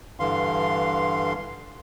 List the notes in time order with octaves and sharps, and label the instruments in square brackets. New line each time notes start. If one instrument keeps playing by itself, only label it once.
[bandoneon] G2 D3 E3 F5 C6